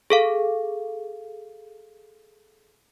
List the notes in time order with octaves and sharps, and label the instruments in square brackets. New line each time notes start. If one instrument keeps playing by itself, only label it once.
[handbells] G#4 A4 F5